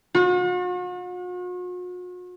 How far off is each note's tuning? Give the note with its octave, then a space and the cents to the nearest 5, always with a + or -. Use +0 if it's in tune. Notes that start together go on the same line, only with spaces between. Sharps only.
F#4 -45